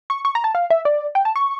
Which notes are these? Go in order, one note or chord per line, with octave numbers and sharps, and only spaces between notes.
C#6
C#6
A#5
A5
F5
E5
D5
G5
A5
C#6